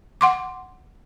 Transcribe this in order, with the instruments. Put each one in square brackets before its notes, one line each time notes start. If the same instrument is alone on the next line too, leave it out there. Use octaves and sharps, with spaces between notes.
[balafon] F#5 C6 D6